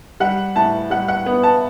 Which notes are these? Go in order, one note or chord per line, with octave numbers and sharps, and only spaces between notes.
G3 F#5
A2 A5
G3 F#5
F#5
B3
A5